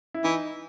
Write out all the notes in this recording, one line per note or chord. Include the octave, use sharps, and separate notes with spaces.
E4
E3 D#4